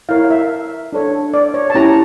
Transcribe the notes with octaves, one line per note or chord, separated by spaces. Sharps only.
E4 A#4 C#5 F5
E5
D4 A4 C#5
D5
C#5
A5
C#4 E4 G4 C#5 A#5